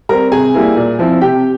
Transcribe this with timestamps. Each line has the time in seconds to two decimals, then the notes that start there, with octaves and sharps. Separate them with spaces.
0.09 G3 C4 A#4 A#5
0.32 C3 G#4 G#5
0.54 G3 A#3 E4
0.77 A#2
0.99 F3 C4 E4
1.21 C3 G4 G5